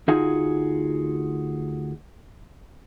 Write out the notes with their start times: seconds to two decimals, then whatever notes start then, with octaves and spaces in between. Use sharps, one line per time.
0.08 D2 D#4 F4 F#4 G#4 G#5